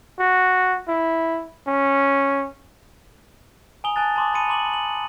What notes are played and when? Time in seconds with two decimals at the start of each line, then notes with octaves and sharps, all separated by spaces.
0.19 F#4
0.88 E4
1.67 C#4
3.84 G#5 A#5 D#6 F7 G7
3.96 G#5 A5 F#6 A6
4.16 A5 B5 C6 D6 D#6
4.34 A5 B5 C6 C#7 D#7
4.48 A#5 C6 D6 F#7
4.73 F#7